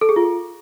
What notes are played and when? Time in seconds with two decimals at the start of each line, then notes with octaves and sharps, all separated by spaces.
0.01 A4
0.09 G#4
0.16 F4